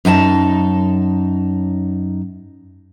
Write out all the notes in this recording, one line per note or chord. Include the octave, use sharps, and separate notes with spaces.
F#2 D#4 G#5 A5